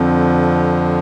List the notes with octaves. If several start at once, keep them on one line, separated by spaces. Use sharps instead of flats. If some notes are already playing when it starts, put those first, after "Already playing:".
Already playing: F2 D3 F3 C4